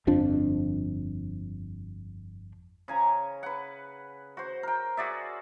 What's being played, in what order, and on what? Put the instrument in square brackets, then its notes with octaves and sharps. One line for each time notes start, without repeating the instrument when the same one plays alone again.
[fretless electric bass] G1 F2 F3 D4
[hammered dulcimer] C#3 G#5 A#5
B4 F#5
F#4 C5
A#4 G5
F#4 G#4 D5 E5